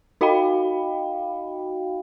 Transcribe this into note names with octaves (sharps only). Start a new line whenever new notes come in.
D#4 F#4 D#5 F5 G5 B5